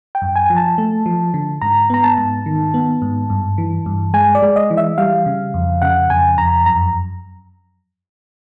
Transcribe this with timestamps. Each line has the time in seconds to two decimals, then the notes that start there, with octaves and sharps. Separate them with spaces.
0.15 G5
0.22 F#2
0.36 G#5
0.50 F3
0.57 A5
0.78 A3
1.06 F3
1.34 D3
1.62 G#2 A#5
1.90 B3 A#5
2.04 A5
2.18 G#2
2.46 D#3
2.74 B3
3.02 G#2
3.30 G2
3.58 E3
3.86 G2
4.14 G#3 G#5
4.35 D5
4.42 G#3
4.56 D#5
4.71 E3
4.77 E5
4.98 G3 F5
5.26 C#3
5.54 F2
5.82 C#3 F#5
6.10 F2 G#5
6.38 F2 A#5
6.66 F#2 A#5